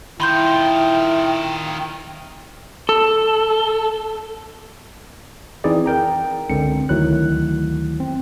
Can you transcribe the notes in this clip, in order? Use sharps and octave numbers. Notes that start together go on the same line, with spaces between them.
D#3 E4 F4 G5 B5 C6 G6
A4
E3 C4 D#4 E4 G#4 D5
A#4 G5 A#5
C#2 D3 C4 C#7
D2 D#3 F#3 E4 F#6
C4